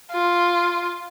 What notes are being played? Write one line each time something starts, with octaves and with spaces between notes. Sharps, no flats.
F4